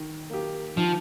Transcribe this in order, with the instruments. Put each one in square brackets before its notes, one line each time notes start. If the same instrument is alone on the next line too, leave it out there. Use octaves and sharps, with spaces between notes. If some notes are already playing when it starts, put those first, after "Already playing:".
Already playing: [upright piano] D#3
A#3 G4
[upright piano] D#3 [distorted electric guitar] F3